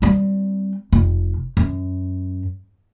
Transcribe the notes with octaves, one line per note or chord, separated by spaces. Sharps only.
G3 C4
F1
F#2